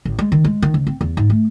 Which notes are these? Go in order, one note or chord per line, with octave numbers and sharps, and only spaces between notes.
A1
G#3
D#3
G#3
D#3
C#2
C4
E2
G#2
A3